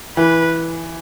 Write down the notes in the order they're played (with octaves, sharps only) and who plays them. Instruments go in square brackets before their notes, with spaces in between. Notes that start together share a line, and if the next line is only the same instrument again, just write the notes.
[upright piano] E3 [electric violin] B4